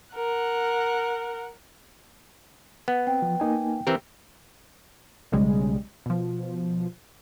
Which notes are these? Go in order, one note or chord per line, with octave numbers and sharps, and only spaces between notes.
A#4 F#5
B3 F#5
C4 G5
F3
A#3 D#4 G#5
E3 C4 G4 A#4 E6
B1 C#3 G3 G#3
B2 F3